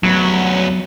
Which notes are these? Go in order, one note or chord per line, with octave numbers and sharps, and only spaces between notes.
D2 F#3 B3